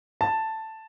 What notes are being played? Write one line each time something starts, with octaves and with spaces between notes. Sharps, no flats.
A5